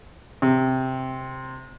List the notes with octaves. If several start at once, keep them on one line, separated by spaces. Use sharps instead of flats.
C3